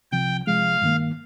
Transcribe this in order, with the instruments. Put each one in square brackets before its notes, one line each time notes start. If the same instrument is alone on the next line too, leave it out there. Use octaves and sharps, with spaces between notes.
[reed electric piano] C2 C3 F3 [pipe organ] G5
[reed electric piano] C3 F3 G#3 [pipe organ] F5
[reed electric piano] G2 D#3 A#3